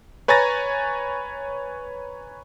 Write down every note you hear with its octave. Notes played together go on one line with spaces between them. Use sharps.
B4 C#5 G#5 A#5 A6 A#6